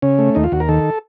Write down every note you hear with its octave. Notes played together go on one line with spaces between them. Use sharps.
C#3 C#4
A3
D#2 D#4
F4
D#2 F#4
A#4
D#3 A4